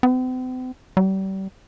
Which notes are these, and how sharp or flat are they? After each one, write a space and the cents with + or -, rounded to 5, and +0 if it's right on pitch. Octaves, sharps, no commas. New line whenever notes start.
C4 -45
G3 -35